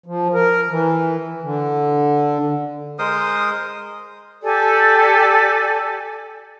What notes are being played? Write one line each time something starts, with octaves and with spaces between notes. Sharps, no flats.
F3
A#4
E3
D3
G#3 A#4 C5 D#6
G4 A4 D5 G#5